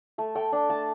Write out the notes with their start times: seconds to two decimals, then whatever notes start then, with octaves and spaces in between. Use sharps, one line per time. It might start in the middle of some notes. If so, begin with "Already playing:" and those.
0.18 A3 E5
0.35 A3 G5
0.52 D4
0.70 A3 A5